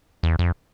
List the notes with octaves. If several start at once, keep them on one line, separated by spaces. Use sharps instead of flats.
E2
F2